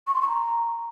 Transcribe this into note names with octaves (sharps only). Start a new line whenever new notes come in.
C#6
C6
C#6
A#5